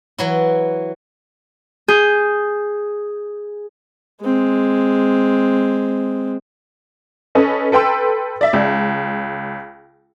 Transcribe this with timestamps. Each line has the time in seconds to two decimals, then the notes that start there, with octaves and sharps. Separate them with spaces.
0.18 E3 F#3 E4
1.88 G#4 G6
4.22 G#3 C4
7.35 C#4 A4 B4 D#5
7.72 A4 B4 G5 C6 E6
8.41 D5 E5
8.53 C#2